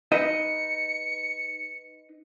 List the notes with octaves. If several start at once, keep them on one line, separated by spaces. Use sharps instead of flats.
D#4 B4 D#5 C#7